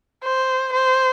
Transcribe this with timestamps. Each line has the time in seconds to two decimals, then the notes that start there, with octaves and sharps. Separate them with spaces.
0.24 C5
0.73 C5